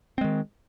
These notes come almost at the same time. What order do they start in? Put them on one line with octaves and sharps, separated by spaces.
C4 G#3 D#3